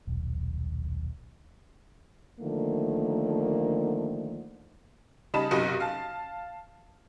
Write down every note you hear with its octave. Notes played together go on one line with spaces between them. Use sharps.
D#1 B1
D3 D#3 F3 A3 A#3
C#3 G3 D#4 A5 B5 E7
F#1 B1 C3 F#4 D#5
F5 A5